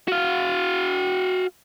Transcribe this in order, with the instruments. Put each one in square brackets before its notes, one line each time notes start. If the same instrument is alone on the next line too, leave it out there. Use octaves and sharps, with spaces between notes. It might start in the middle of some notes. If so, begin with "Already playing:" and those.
[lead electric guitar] F#4 F5